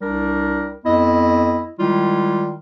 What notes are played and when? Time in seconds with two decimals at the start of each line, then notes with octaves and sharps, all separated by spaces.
0.01 C2 G3 D4 A#4
0.85 F2 B3 E4 D#5
1.78 D#3 G3 G#3 E4 F4